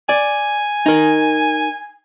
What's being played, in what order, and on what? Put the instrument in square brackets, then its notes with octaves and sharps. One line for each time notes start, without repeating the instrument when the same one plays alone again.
[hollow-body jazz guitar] D5 [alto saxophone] G#5
[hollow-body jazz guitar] D#4 A#4